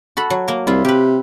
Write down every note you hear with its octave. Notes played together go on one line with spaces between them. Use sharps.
F#4 A4 B5
F#3
A#3 A#4
C2 E4 F4
C3 G4 B4